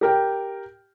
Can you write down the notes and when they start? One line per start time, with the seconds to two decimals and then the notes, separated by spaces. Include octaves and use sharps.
0.01 G4 A#4 G5